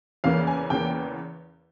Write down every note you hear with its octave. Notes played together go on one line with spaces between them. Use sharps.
E2 C#3 E3 A#3 F5
G#5
E2 C#3 E3 A#3 G5